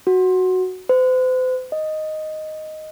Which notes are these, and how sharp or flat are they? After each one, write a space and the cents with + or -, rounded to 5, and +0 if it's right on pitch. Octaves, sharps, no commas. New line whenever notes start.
F#4 +0
C5 -40
D#5 +0